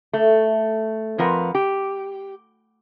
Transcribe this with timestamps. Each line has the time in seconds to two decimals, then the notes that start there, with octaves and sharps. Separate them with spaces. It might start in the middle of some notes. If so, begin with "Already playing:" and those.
0.13 A3
1.18 F2 F3 A#4 B4 F#5
1.55 G4